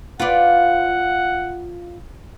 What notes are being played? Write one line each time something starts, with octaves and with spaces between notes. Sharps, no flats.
F4 B4 D5 F#5